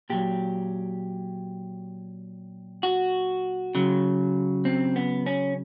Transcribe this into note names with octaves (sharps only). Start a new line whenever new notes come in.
A#2 F#3 G4
F#4
C#3 F#3
C4
B3
C#4